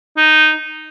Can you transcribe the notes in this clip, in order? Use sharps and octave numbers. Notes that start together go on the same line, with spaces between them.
D#4